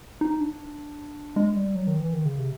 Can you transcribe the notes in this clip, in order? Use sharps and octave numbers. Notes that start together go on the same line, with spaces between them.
D#4
D4
G#3
G3
F#3
D#3
E3
D#3
C#3
C3